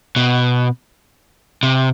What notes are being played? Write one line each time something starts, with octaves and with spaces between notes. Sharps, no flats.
B2
C3